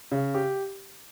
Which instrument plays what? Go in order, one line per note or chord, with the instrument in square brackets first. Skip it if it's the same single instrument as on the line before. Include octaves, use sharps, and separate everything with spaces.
[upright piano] C#3
G4